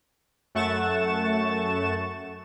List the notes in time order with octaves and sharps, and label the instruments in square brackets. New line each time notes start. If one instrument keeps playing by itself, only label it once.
[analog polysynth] F#2 A3 F#5 C#6 A6 E7